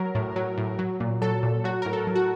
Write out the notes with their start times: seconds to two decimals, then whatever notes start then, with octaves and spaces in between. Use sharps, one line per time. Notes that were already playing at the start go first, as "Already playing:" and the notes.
Already playing: F#3 A#4
0.15 A2
0.36 F#3
0.58 A2
0.79 F#3
1.00 A#2
1.22 F#3 A4
1.43 A#2
1.64 F#3 F#4
1.82 A2 A#4
1.93 A4
2.07 F#3
2.15 F#4